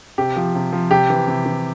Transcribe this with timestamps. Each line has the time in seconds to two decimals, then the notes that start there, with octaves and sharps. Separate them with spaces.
0.18 C3 G4
0.36 F3
0.55 C3
0.73 F3
0.90 C3 G4
1.10 E3
1.28 C3
1.46 E3